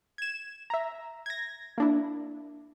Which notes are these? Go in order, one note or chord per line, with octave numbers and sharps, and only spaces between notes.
G#6 E7
E5 A#5
G#6 A#6
A#3 D4 E4